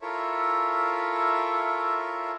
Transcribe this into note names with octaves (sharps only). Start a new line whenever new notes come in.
E4 F4 A4 A#4 C#5 E5